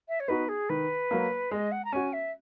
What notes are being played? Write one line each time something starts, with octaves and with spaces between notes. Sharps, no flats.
E5
C#5
B3 D#4 F#4 B4
G#4
D#3 B4
F#3 A#3
G#3 D#5
F#5
A#5
C#4 F#4 G#5
E5